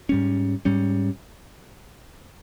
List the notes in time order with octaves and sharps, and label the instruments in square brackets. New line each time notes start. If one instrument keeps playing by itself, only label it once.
[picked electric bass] G#2 G3 C#4
G#2 G3 C#4